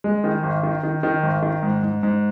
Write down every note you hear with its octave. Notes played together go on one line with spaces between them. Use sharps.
G#3
D#3
G#1
D#3
D#3
D#3
G#1
D#3
G#2
G#2
G#2